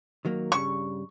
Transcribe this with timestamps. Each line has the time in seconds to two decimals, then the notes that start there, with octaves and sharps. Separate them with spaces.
0.25 D#3 F#3 A#3
0.52 G2 C#3 G3 C#6